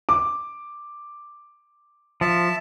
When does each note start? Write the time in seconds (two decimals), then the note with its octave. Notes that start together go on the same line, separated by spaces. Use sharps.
0.09 D6
2.21 F3 E5 A5